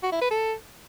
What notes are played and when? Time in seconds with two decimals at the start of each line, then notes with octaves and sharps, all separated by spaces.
0.03 F#4
0.12 E4
0.21 B4
0.31 A4